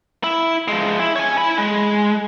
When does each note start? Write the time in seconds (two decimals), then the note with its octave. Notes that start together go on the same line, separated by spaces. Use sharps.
0.24 E4
0.68 F3 G#3
1.00 E4
1.16 C#5 G#5
1.38 E4 B5
1.58 G#3